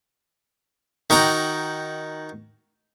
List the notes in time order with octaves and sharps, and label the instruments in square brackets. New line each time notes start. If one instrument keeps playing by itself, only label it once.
[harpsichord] D#3 F#4 G5 A#5